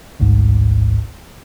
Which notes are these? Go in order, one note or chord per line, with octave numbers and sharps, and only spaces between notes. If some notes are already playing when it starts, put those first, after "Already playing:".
A1 D2 G#2